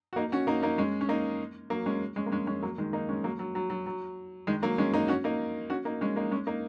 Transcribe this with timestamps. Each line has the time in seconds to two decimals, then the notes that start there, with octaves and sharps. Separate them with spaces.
0.13 F#4
0.16 A#3 D#4
0.32 C#4 F#4
0.47 A#3 D#4
0.63 A#3 D#4
0.78 G#3 C#4
1.01 C#4
1.09 A#3 D#4
1.70 F#3 A#3
1.86 G#3 C#4
2.16 G#3 C#4
2.26 A#3
2.31 G#3 C#4
2.47 G#3 C#4
2.63 F#3 A#3
2.78 D#3 G#3
2.93 A#3 D#4
3.09 G#3 C#4
3.24 F#3 A#3
3.39 F#3
3.55 F#3
3.70 F#3
3.86 F#3
4.47 D#3 G#3
4.62 F#3 A#3
4.78 G#3 C#4
4.93 A#3 D#4
5.08 C#4 F#4
5.24 A#3 D#4
5.70 C#4 F#4
5.85 A#3 D#4
6.01 G#3 C#4
6.16 A#3 D#4
6.31 G#3 C#4
6.47 A#3 D#4